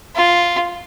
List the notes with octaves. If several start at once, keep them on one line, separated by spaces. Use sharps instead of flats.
F4